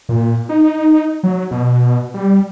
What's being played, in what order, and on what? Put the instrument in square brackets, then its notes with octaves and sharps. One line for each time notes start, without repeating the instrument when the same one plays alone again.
[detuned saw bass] A#2
D#4
F#3
B2
G3